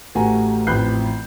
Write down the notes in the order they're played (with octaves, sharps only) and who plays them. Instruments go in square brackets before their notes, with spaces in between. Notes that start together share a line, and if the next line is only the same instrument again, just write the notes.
[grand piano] A1 A3 F#4 G4 G#5 A#5
A1 F2 B5 F#6 G6 C7